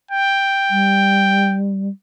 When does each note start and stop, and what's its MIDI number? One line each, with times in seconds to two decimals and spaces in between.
0.11 1.58 79
0.70 1.88 55